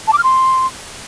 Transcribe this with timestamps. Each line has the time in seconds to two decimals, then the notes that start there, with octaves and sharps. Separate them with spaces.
0.07 A5
0.13 D6
0.18 F6
0.23 C6